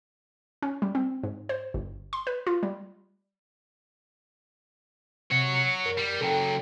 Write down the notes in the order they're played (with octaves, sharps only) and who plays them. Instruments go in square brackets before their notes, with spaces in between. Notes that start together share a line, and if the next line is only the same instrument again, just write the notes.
[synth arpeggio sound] C#4
G3
C4
G#2
C5
G1
C6
B4
F4
G3
[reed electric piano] C3 [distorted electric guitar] C#5 F#5
[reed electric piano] F#2 A#4
[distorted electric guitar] G3
[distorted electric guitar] C#3 F#3 [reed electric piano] A4 G5